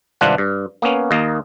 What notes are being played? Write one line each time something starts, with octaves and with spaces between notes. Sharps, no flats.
G#1 G2 C3 D4 F4 F#5
G2
A#3 B3 C#4
D#2 A#3 D#5 F5